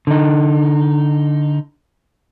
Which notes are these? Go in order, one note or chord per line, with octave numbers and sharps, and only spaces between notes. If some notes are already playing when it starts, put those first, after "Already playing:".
D3 D#4